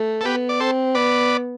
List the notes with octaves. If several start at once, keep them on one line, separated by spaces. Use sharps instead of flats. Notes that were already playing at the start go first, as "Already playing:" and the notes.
Already playing: A3
A4
B3 G4 B4
D5
C4 A4 C5
B3 B4 D5